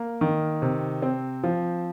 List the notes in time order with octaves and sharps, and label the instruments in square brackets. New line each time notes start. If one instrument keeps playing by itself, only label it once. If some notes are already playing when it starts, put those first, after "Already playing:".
Already playing: [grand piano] A#3
D#3
C3
C4
F3